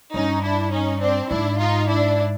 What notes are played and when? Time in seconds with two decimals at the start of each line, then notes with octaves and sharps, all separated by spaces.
0.14 G2 C#4 D#4
0.43 D4 E4
0.72 C#4 D#4
1.01 C4 D4
1.30 G#2 D4 E4
1.59 D#4 F4
1.88 D4 E4